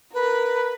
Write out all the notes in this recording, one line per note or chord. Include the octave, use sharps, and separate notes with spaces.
A#4 B4